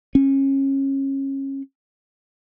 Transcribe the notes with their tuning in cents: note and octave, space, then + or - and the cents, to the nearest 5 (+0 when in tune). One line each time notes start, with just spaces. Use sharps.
C#4 -25